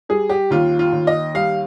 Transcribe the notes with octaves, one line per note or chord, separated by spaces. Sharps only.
G3 G#4
G4
D#2 F4
F4
D#2
D#5
G3 F5